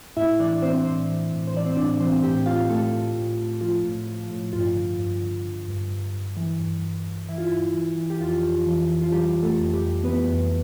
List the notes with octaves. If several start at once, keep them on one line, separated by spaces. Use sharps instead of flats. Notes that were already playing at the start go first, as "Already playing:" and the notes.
A2 E4 E5
E3 D4 D5
E3 C4 C5
A2 C4 C5
E3
A2
C5
E3 D5
C4 C5
A2 D4 D5
E3 C4 C5
A2 G4 G5
A2 F4 F5
A2 A3 A4
A2
A2
A2
F3 F4
A2
F3
A2
G2 F4
D3
G2
D3
D3
G2
G2
G2
E3
G2
G2
G2
E3 E4
F4
G2 E4
E3
E3
G4
F2 F4
F2
E3
E3
F4
E3 G3 G4
E3
A3 A4
F2
G3 G4
F2
E3 B3 B4
F2